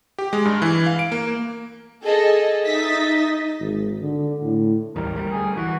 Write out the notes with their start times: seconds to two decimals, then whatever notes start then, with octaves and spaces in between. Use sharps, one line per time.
0.19 G4
0.33 G#3
0.45 G2
0.62 E3
0.86 F5
0.99 D7
1.12 A#3
2.03 G#4 A4 D#5
2.65 D#4 D#5 E5 A6 B6
3.60 G#1
4.02 D3
4.43 A2
4.96 A1 D#2 G3 A#4
5.16 D2 G3
5.32 G#4
5.57 E3 F#4